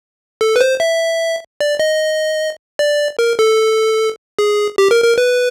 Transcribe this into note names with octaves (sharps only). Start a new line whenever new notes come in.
A4
B4
C5
E5
D5
D#5
D5
A#4
A4
G#4
G4
A#4
A#4
B4